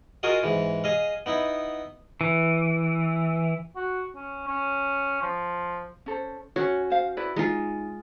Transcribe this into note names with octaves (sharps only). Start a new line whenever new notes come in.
F4 F#4 G#4 A#4 D#5 F5
G#2 E3
G#4 D#5 F5
B3 D#4 E4
E3
F#4
C#4
C#4
F3
C#4 A4 C5
C#4 F#4 C#5
C5 F5
E4 B4 D5
G#3 D#4 F4